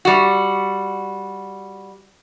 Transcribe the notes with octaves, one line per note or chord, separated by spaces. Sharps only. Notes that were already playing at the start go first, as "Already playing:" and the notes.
G3 F#4